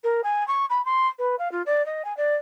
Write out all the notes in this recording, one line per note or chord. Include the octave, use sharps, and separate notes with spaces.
A#4
G#5
C#6
B5
C6
B4
F5
F4
D5
D#5
G#5
D5